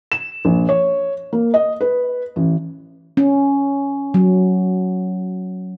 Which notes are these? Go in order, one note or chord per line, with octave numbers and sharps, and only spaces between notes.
E7
A#1
C#5
A#3
D#5
B4
A1
C#4
F#3